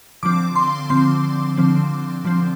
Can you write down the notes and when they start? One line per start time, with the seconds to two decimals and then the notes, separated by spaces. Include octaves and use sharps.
0.23 D3 F3 C4 D6
0.56 C6
0.90 D3 F3 C4 C6
1.57 D3 F3 C4
2.25 D3 F3 C4